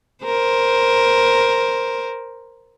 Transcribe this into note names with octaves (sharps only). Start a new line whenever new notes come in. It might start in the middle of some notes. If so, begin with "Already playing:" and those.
A#4 C5